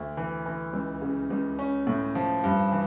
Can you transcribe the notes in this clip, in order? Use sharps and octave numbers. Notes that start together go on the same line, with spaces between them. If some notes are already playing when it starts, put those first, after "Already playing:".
Already playing: D2
E3
E3
C#2
C#3
C#2
C#4
A2
F3
G2
E3